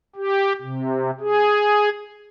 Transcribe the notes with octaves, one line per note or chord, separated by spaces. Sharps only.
G4
C3
G#4